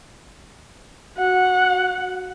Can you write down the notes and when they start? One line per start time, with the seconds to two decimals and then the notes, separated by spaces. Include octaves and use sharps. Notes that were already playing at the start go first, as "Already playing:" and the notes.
1.18 F#4 F#5